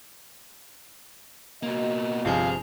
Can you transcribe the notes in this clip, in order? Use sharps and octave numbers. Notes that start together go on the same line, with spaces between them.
B2 A#3 F#4 D#5
G1 C3 F3 G#4 F5